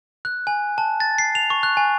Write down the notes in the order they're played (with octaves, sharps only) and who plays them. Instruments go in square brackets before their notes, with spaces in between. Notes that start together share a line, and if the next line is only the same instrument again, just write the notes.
[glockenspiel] F#6
G#5
A5
A6
C7
F7
C#6
F#6
G#5